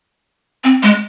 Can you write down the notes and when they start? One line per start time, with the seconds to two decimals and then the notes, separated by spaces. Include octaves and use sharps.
0.64 C4
0.83 G#3